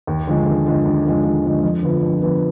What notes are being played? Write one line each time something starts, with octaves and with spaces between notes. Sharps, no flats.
D#2
D3 F3 G#3
D#2
D3 F3 G#3
D#2
D3 F3 G#3
D#2
D3 F3 G#3
F2
D3 F3 B3
F2
D3 F3 B3